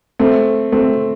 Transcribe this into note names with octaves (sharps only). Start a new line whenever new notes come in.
A3 C4
A3 C4